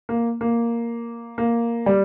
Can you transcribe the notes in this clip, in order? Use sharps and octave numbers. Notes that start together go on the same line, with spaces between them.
A#3
A#3
A#3
G3